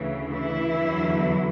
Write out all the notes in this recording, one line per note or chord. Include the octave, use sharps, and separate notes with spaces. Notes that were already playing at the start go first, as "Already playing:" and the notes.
Already playing: D2 C#3 E3
E3 E4
E2 D3 F#3